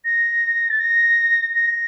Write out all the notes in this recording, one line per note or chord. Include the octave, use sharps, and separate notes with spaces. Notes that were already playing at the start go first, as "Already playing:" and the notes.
A#6
A6
A#6
A#6